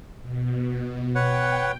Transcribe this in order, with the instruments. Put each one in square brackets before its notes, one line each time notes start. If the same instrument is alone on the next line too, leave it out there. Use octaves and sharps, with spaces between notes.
[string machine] B2
[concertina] B4 C#5 F#5 [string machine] G5